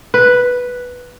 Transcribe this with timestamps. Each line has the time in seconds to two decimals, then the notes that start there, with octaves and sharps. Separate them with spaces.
0.14 B4